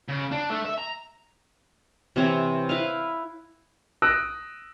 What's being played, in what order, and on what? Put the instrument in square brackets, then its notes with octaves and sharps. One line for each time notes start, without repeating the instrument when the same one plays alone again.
[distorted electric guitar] C#3
D4
A3
E5
A#5
[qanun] C3 E3 C4 C#5
E4 B4 F5
[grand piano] D#6 E6 F#6 A#6 D7